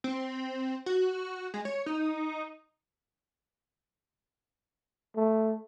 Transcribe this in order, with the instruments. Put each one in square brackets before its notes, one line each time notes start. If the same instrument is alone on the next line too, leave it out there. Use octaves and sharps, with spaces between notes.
[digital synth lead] C4
F#4
G#3
C#5
D#4
[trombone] A3